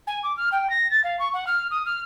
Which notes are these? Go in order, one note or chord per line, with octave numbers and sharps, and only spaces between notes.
G#5
D6
F6
G5
A#6
A6
F5
C#6
F#5
F6
D#6
F6